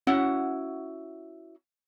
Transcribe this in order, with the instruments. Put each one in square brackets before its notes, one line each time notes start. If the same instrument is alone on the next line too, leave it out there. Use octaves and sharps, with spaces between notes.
[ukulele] C#4 E4 F#4 F#5